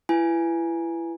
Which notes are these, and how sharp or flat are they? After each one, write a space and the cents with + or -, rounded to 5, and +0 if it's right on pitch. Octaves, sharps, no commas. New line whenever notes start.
E4 +30 B4 +0 G#5 +0